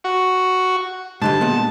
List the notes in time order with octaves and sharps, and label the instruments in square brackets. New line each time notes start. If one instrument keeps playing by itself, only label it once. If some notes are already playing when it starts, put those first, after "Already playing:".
[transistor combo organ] F#4
[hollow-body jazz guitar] G#2 D3 G3 [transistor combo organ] A5
[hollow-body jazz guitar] A#2 G#3 B3